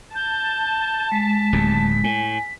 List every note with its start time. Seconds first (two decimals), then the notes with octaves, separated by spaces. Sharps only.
0.15 A5 G6
1.12 G#3 B6
1.53 D1 D#2
2.04 A2 G#5